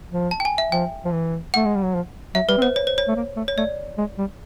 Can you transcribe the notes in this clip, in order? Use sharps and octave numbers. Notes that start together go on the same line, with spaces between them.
F3
A5
G5
G#5
E5
F3 G5
F3
E3
A3 F#5
G#3
G3
F#3
F3
F#3 E5
G3 B4
C4
B3 C5
C#5
C5
C#5
A3
A#3
A3
C#5
A3 D5
G#3
G3